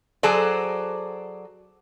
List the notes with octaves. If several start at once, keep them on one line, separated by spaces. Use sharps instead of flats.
F#3 G#4 A4 C5 D5